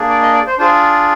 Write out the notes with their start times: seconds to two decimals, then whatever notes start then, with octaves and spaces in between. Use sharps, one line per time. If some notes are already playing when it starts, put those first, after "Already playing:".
Already playing: A#3 D4 G#4
0.09 D5
0.22 D#5
0.34 D5
0.47 C5
0.58 D4 F4 G#4 C5